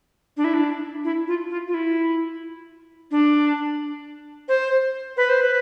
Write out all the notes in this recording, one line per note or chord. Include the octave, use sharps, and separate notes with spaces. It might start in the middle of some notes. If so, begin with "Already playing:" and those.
D4
E4
D4
E4
F4
F4
F4
E4
D4
C5
B4
C5
B4